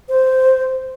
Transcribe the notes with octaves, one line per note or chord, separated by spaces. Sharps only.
C5